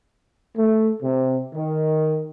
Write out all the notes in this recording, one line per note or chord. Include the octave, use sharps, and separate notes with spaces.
A3
C3
D#3